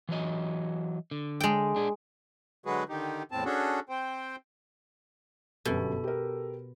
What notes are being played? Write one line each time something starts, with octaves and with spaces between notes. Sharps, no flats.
E3 F#3 D#5
D3
G#3 G5
D4 G#4
D3 F#3 G#3 F#4 G#4 B4
D3 D#3 D#4 G4
E2 A2 C4 A5
C#4 D4 F#4 G#4 A4
C4 C5 G5
G1 F#2 B2 G4 A4
G4 A#4